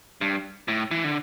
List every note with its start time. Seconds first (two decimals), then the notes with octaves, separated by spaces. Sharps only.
0.21 G2
0.68 A2
0.91 E3
1.04 D3